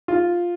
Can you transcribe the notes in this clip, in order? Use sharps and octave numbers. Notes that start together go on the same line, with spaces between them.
F4